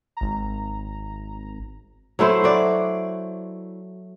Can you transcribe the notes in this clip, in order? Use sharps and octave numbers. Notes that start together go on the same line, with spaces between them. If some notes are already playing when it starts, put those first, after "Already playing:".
G#1 A#5
F#3 A3 E4 C5
F#4 D5